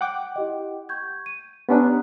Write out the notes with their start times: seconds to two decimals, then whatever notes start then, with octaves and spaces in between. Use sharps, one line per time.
0.01 F#5 G5 D6
0.36 E4 G4 D#5
0.89 C#6 G6 G#6
1.26 D#7
1.69 B3 C#4 D4 G4 A#5 F#6